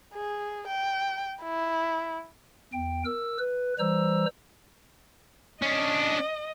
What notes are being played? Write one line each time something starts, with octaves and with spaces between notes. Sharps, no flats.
G#4
G5
E4
E2 G5
A#4 E6
B4
E3 G3 C5 A#5 E6
C#4 D4 D#5